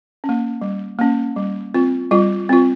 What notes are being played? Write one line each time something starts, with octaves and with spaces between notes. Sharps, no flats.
C#4
A#3
G3
A#3 C#4
G3
C4 F4
G3 F4
C4 F4